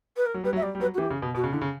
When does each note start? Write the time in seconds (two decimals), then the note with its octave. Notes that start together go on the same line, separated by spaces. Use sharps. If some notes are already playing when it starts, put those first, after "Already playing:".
0.16 B4
0.26 A#4
0.34 F#3
0.44 G3 B4
0.53 F#3
0.56 E5
0.62 G3 D5
0.75 G3
0.80 F#3 B4
0.94 F#4
0.98 E3 G4
1.10 C#3
1.22 B2
1.35 B2 F#4
1.44 C#3
1.52 D3 E4
1.61 C#3